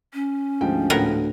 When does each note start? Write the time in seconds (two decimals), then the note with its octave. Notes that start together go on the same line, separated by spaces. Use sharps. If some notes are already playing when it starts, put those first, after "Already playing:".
0.14 C#4
0.61 D2 G#2 F3 G5
0.90 D2 A2 B3 A#4